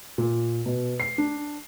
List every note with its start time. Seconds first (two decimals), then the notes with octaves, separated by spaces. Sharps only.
0.18 A#2
0.66 B2
1.00 C7
1.18 D4